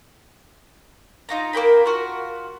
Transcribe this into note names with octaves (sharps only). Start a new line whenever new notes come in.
D#4 F4 A#5
A#3 A#4 G5 B5
F4 F#4